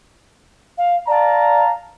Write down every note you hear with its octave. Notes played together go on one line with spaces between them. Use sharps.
F5
D5 F5 A5 A#5